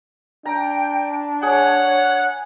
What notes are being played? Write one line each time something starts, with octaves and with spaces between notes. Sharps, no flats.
D4 G5 A#5
G#4 C#5 F#5